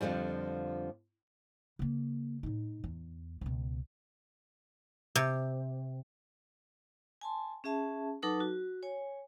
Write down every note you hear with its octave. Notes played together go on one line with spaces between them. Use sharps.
F2 A#2 D3 F3 G3
C#3 A#3
A2 D#4
E2
C#2 B2
C3
G#5 A5 C6
C#4 G#4 E5 A5
F#3 D#4 A4 B4 A5 D6
F#4
C#5 G#5